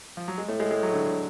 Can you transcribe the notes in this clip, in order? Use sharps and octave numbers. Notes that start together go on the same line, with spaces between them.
F3
F#3
G#3
A2 A3
G#3
G#3
F#3
D3
D3